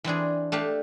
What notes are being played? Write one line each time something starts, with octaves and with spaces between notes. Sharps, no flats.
E3 C4 D4 G#4
A3 D4 G4 F5